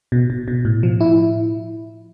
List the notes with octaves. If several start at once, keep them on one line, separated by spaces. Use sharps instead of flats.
B2
B2
B2
A2
F3
E4